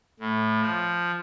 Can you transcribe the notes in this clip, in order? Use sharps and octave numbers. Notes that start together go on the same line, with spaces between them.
A2
F3